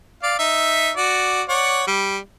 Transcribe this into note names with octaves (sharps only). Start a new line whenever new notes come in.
D5 F5
D#4 E5
F#4 D5
C#5 D5 F#5
G3